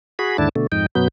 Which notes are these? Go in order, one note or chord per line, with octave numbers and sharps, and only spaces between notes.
F#4 G#4 B5
D#2 G#2 D3 D4 E4 A5
B2 D3 A3
F2 G#2 D#4 G5
F#2 B2 F#3 B3 G6